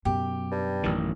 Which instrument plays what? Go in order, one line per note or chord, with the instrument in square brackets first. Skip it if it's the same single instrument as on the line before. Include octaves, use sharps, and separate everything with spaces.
[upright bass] F#2 B2 [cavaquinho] G4
[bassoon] G2
[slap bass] A1 D#3